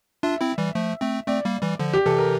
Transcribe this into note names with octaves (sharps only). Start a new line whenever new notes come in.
D4 F4 E5
C4 E4
E3 G3
F3 A3
A3 C4
A3 C4 D5
G3 A#3
E3 G3
D3 F3
G4
C3 E3 A4
A#4